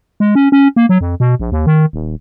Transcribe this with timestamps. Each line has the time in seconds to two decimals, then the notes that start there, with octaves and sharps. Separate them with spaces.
0.20 G#3
0.35 C#4
0.52 C#4
0.76 A#3
0.89 F#3
1.01 F2
1.20 B2
1.40 A#1
1.52 D#2
1.66 D#3
1.93 D#1